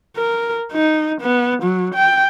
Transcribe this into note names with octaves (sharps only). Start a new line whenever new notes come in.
A#4
D#4
B3
F#3
G5